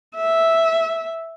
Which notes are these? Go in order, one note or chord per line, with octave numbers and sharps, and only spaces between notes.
E5